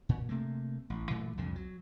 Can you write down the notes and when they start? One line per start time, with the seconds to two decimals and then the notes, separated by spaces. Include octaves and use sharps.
0.09 A#2
0.29 C3 A3 A#3
0.90 A1
1.10 A#2 E3 F#3 A3
1.37 C2 F2 A#2 D3
1.56 F#3